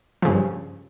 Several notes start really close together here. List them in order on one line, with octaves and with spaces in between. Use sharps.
F3 C#3 G2